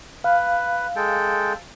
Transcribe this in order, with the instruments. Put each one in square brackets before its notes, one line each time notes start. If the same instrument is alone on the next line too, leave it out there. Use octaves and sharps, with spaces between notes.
[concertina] B4 [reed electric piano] F5
[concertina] G#3 A4 G5